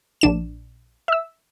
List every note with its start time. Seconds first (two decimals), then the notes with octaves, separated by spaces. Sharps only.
0.21 A#1 D4 E7
1.08 E5 E6